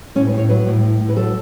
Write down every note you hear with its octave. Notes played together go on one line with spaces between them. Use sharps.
A2 C#4
B4
A2
C#5
F#3 B4
A2
A2
A2
B4
F#3 A4